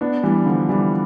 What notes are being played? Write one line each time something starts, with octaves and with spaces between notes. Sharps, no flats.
B3 D4
E3 G3
D3 F3
E3 G3